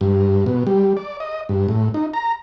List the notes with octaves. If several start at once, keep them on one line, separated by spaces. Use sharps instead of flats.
G2
B2
G3
D5
D#5
G2
A2
D#4
A#5